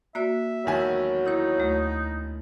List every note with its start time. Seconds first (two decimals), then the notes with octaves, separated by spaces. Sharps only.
0.15 A#3 F#4 D5 E5
0.66 E1 D#3 F#3 G#5
1.26 D#4 E4 C#5
1.58 D2 A3